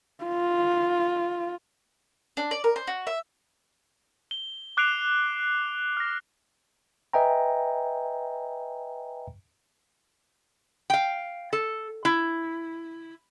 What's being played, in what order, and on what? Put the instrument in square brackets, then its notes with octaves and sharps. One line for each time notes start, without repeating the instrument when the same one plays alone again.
[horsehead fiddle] F4
[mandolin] D4
D5
A#4
C5
F#4
E5
[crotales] G7
D6 F#6 C7 D7 F7
F6 A#6
[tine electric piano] B4 D#5 E5 G5 G#5 A#5
[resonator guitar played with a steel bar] F5 G5
A4
E4